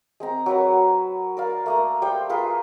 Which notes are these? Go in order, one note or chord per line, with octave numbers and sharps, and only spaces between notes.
G#3 C4 A#5
F#3 A#4 B4 F#5
A#4 D5 F5
A3 A#3 D#6
G3 C5 G5 C6
F4 G#4 A#4 B4